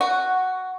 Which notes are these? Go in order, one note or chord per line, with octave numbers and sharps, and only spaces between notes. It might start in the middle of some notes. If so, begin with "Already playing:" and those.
F#4